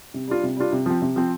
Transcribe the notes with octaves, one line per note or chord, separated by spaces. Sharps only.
C3
G3 D4 F4
C3
G3 D4 F4
C3
F3 C4
C3
F3 C4